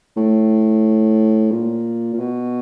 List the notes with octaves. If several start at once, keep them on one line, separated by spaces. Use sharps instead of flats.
A2
A#2
A#2
B2